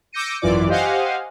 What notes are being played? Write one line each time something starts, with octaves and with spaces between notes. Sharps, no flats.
D6 E6 G6 A#6 C#7 D#7
G#1 F#2 E3 F4 D5 D6
G4 C5 D#5 F5 F#5 G#5